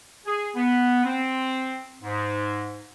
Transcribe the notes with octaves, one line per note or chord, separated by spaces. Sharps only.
G#4
B3
C4
G#2